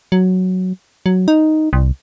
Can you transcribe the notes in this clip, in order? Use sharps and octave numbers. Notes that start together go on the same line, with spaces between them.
F#3
F#3
D#4
C2